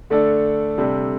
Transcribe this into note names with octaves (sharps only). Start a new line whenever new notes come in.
D3 A3 D4 A4
C3 G3 D4 A4